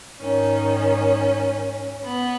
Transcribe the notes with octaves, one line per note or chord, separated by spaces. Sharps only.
G#2 D#3 C#4
B3